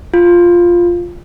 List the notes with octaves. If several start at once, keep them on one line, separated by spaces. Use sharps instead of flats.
F4